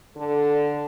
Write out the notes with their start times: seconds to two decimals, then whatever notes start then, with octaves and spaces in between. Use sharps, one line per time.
0.17 D3 A4